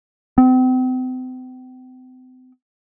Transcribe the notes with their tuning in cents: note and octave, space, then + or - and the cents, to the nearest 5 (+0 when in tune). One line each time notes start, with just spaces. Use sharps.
C4 -40